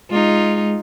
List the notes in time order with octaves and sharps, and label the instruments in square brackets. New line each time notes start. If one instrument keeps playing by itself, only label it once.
[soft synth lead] G#3 [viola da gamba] D#4 F4